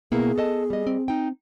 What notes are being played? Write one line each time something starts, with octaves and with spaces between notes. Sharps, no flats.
B2 A#3 B3 E4 G#4
A4 D#5 A5
G3 D#5
C4
D#4 G5